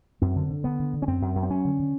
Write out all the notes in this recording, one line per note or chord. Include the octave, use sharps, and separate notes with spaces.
F#2 C4
D3
D3
D3 B3
D3
D3
C#4
F#2 C4
F#2
F#2
C4
F#2 C#4
D3
D3